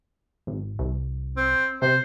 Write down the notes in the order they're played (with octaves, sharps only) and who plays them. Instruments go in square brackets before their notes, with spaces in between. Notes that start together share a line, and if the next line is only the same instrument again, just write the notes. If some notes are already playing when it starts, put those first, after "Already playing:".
[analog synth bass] G#1
C2
[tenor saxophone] C4
[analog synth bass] C3 [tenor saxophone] C5